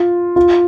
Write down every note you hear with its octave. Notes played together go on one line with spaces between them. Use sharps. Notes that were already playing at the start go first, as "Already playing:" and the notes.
Already playing: F4
F4